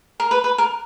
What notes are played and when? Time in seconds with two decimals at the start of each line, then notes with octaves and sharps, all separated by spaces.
0.20 A#4
0.31 B4
0.44 B4
0.58 A#4